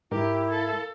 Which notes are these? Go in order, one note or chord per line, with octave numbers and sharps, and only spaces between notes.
G#2 E4 G4 A#4
A4 F5